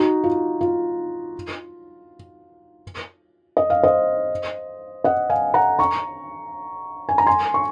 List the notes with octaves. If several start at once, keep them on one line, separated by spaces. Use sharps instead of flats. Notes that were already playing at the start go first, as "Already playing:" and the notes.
Already playing: D#4 F#4
F4
F4
D#5
F5
C5 D#5
D#5 F#5
F5 G#5
F#5 A#5
A#5 C#6
G#5
A#5
G#5 C6
C#6